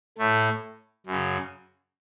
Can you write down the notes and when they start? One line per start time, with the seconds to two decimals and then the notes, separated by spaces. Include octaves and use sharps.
0.18 A2 A3
1.06 F#2 C#3